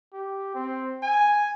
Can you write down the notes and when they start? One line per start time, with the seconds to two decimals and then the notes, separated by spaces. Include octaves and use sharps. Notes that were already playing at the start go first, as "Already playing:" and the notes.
0.13 G4
0.55 C4
1.03 G#5